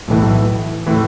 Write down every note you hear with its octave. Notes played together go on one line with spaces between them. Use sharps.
B1 A2 E3
A2 E3